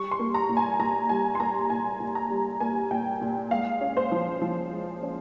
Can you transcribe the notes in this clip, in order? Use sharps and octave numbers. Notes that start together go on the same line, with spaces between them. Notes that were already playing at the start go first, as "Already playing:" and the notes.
Already playing: G3 C#6
C6
A#3
A#5
A#2
G#5
A#2 A#5
G3 G#5
C6
A#3 A#5
A#2 G#5
A#2
A#5
G3
A#3 G#5
A#2 G5
A#2
G#3 F5
C#4
C5
F3
F3
G#3
C#4